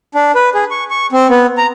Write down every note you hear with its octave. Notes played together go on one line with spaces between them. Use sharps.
D4
B4
G#4
C#6
C#6
C4
B3
A#5